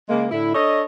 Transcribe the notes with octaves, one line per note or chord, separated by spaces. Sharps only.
C#3 G#3 A#3
A2 D3 E4
D4 A4 C#5 D#5